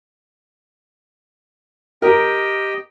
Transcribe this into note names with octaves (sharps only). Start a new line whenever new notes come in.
G4 A#4 D#5 G5